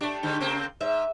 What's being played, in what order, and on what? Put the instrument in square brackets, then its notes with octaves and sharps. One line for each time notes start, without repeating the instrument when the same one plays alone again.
[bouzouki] A3 G4 [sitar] D4
[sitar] G#2 D3
C#3 A#3 C4
[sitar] G#2 [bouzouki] E5